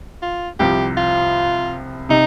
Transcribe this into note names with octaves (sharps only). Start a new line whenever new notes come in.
F4
C2 C3 F3 G4
F4
C3 D#4